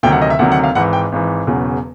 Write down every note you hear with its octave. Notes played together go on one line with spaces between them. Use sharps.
D2 C3 D#3 F#3 G5
F#5
D#5
E5
D2 C3 D#3 F#3 F#5
F#5
F5
G#1 G#2 E3 F#5
G5
G#1 G#2 E3
E1 E2 C#3 F#3